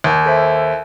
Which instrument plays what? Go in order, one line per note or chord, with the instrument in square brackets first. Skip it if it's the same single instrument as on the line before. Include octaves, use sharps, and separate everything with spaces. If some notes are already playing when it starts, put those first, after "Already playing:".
[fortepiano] D#2
[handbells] A4 C5 E5